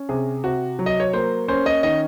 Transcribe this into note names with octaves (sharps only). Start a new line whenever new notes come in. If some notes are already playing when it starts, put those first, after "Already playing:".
Already playing: C#4
C3 G#4
C3 F#4
F#3
D#5
C#5
A#3 C5
C#4 C5
D#5
D#3 D#5